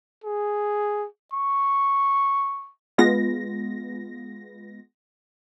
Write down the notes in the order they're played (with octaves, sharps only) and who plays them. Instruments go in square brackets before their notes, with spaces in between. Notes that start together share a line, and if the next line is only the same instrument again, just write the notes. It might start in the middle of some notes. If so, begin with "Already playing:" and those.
[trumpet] G#4
C#6
[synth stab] G#3 B3 F4 A#6